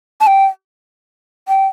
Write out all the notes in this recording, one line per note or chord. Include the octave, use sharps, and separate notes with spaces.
A5
G5
G5